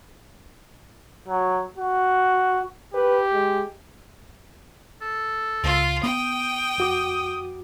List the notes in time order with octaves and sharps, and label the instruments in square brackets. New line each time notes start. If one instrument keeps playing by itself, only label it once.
[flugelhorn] F#3
F#4
[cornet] G4 [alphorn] B4
[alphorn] G#3
[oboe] A4
[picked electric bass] C#2 [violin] F4
[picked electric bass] B3 [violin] G5 [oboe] D#6
[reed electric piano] F2 F#4 D6